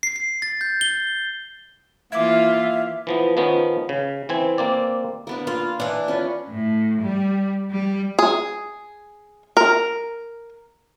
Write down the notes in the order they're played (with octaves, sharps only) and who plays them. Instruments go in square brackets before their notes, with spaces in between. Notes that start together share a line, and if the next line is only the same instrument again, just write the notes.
[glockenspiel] C7
C7
A6
G6
G7
[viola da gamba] E3 A#3 F4 [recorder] E5 [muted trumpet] F5 [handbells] D6 G#6
[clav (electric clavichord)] E3 F3 B3
D#3 F3 B3 C#4
C#3
E3 C4 G#5
A#3 C4 D5
[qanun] A#3 B3 D4
[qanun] A#3 [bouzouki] F4
[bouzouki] E3 D4
[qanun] C#4 F4 B4
[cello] A2
G3
G3
[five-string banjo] G#4
A#4